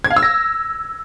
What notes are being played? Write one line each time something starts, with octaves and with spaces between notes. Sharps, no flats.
G#6
F5
E6
A#6